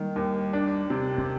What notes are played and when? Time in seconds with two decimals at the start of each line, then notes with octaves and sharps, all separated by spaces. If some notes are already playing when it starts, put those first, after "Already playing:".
Already playing: D#3 G3 A#3
0.16 D#2
0.53 D4
0.90 C3
1.18 C4